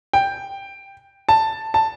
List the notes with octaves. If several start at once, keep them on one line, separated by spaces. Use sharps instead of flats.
G5
A5
A5